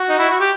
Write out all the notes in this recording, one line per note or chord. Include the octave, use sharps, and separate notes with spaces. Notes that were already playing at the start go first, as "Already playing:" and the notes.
Already playing: F#4
D#4
E4
F#4
G4